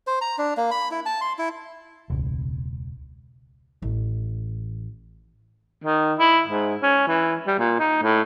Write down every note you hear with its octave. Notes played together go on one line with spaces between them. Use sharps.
C5
A#5
D4
A#3
B5
E4
A5
C6
E4
E1 C#2
A1
D#3
E4
G#2
C#4
E3
G3
A#2
D#4
A2